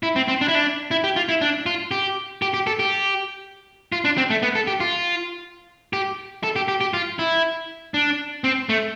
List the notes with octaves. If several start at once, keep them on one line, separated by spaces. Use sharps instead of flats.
E4
C4
C4
D4
E4
D4
E4
G4
F4
E4
D4
F4
G4
G4
G4
A4
G4
F4
D4
C4
A3
B3
A4
G4
F4
G4
A4
G4
G4
G4
F4
E4
D4
C4
A3